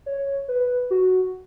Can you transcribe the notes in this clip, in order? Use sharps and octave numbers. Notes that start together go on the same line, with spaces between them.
C#5
B4
F#4